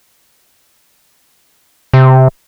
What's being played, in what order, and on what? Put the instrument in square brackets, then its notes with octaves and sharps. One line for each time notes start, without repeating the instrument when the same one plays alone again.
[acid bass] C3